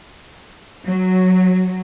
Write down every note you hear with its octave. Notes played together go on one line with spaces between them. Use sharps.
F#3